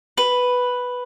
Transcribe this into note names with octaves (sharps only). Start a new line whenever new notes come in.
B4